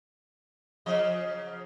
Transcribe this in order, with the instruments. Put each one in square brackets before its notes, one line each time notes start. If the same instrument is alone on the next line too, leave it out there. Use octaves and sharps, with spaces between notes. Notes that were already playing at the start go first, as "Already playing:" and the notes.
[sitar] C#3 F3 D#5